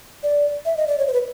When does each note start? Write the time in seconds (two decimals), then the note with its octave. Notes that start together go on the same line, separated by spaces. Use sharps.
0.23 D5
0.65 E5
0.77 D#5
0.87 D5
0.98 C#5
1.08 C5
1.13 B4